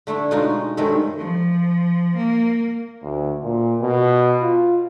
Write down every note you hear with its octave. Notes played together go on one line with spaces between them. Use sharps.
D3 A3 D4 E4
B2 G#3 C#4 D#4 F4
G2 C3 D#3 F#3 G#3 A3
F3
A#3
D2
A#2
B2
F4